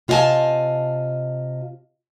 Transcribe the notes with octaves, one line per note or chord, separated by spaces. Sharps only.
C3 F4 D#5 E5 G#5 A5